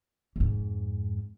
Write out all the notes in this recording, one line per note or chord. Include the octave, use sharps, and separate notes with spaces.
F2 G#2